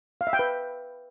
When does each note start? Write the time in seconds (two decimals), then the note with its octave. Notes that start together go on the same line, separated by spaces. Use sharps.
0.21 F5
0.27 E5
0.33 G5
0.39 B4